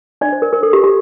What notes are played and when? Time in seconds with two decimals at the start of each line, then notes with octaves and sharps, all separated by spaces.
0.21 D4 D5
0.32 C5
0.42 A#4
0.53 A#4
0.63 A4
0.73 G4
0.84 G4